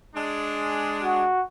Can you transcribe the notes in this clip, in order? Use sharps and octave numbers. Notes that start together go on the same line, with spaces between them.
G#3 D4
F#4